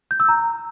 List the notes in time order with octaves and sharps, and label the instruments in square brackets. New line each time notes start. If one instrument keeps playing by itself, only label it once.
[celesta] G6
E6
A#5